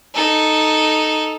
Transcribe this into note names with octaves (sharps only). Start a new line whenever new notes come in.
D#4 A4